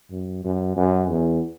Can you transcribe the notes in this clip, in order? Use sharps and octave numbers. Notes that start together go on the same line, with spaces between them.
F#2
F#2
F#2
E2